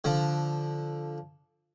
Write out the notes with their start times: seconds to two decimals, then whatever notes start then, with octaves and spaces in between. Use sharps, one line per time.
0.04 D3 F3